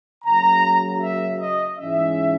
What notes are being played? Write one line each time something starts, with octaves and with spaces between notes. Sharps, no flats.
C#3 F#3 A#3 A#5
E5
D#5
G#2 E3 G#3 C#4 E5